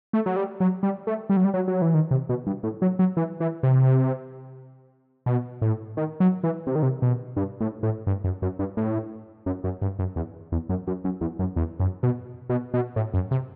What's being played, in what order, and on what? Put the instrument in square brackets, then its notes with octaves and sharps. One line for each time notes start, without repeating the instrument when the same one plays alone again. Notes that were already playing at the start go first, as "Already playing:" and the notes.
[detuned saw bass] A3
F#3
G3
F#3
G3
A3
G3
F#3
G3
F#3
F#3
E3
D#3
C3
B2
G2
A2
F#3
F#3
E3
E3
C3
B2
A2
D#3
F#3
E3
C3
D#3
C3
B2
G2
A2
A2
G2
F#2
F#2
G2
A2
F#2
F#2
G2
F#2
E2
E2
F#2
F#2
F#2
E2
F#2
E2
F#2
B2
B2
B2
A2
F#2
C3